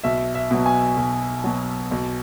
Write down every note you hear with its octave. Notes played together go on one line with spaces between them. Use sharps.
B1 E5
E5
B2 F#3
G#5
B1
B2 F#3
B1